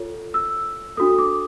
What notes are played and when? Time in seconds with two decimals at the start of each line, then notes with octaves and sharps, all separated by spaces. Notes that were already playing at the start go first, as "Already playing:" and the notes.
Already playing: F4 A4 C#5
0.34 E6
0.97 D4 F#4 A4 D#6
1.19 D6